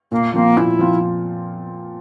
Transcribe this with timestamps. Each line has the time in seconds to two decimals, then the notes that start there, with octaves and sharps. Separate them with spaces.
0.11 A#2 A#3
0.34 F3 A#3 C4 F4
0.57 A#2 E4
0.79 F3 C4 F4